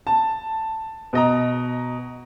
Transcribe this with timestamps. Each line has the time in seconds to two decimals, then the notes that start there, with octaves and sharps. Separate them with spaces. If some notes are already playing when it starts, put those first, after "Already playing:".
0.07 A5
1.13 B2 D#5 A#5